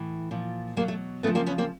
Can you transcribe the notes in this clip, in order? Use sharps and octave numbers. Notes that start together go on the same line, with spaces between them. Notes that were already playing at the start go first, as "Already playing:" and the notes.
Already playing: A2 E3
A#2 F3
B2 F#3 G#3 A#3
A3
C#3 F3 A3 B3
A#3 C4
B3 C#4
A#3 C4